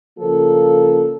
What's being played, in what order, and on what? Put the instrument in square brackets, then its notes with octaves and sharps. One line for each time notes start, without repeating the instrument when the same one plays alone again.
[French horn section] C#3 F3 A#3 F4 A4